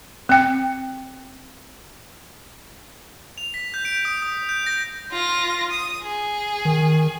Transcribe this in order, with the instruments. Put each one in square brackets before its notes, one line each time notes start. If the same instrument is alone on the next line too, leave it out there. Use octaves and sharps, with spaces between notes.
[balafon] C4 G5
[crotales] F7
B6
G6
D7
D#6
D#6
G6
A#6
[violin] F4 A#6
D#6
G#4
[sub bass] D#3